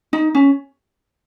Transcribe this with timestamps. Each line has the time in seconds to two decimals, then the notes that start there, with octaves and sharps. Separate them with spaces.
0.13 D#4
0.35 C#4